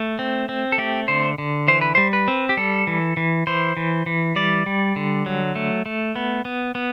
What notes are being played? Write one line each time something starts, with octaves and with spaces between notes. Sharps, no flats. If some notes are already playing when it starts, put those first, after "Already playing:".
Already playing: A3
C4
C4
A4
A3 G4
D3 C5
D3
E3 C5
B4
G3 C5
B4
C4
G4
G3 A4
E3
E3
E3 C5
E3
E3
G3 D5
G3
D3
F#3
A3
A3
B3
B3
B3